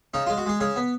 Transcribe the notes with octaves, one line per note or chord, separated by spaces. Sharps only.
C#3 D#4
G#3 F4
F#4
G#3 G#4
C#3 G#4
B3